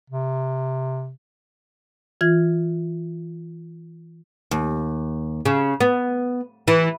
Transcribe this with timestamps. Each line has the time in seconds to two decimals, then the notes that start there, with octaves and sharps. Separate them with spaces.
0.10 C3
2.21 E3 F4 G#6
4.51 D#2
5.46 C#3
5.81 B3
6.68 E3